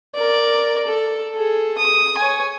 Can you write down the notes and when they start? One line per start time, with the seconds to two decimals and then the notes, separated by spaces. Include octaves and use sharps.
0.15 A#4 D5
0.87 A4
1.34 G#4 A4
1.78 D#6
2.18 C#5 G#5